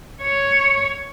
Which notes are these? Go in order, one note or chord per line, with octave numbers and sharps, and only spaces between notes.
C#5